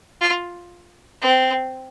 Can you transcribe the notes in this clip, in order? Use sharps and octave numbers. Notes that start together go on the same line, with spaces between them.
F4
C4